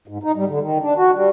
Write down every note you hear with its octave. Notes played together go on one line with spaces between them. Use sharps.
G#2
D#4
G3
D3
D#3
D4
F#4
G3